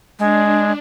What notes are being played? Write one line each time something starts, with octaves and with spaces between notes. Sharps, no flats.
G#3 D4